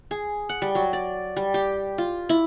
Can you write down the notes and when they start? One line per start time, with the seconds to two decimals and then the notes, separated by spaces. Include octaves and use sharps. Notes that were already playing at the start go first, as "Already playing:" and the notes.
0.11 G#4
0.49 F#5
0.62 G3
0.75 F#3
0.93 D5
1.36 G3
1.54 G4
1.98 F4
2.29 E4